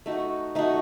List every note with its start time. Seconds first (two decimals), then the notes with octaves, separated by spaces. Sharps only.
0.06 A3 D#4 F#4
0.55 A3 D#4 F#4